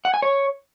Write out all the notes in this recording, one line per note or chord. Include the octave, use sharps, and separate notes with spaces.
F#5
G#5
C#5